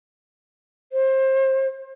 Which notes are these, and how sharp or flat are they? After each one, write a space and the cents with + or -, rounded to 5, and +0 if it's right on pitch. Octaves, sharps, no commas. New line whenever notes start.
C5 +25